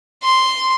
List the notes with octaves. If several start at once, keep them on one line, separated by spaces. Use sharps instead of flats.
C6